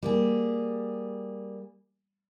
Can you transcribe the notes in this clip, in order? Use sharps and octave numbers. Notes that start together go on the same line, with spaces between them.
G3 A#3 G#4